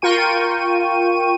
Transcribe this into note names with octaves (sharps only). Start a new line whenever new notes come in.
F4 A#4 G5 C#6 D#7